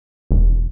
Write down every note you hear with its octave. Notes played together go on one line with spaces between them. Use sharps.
E1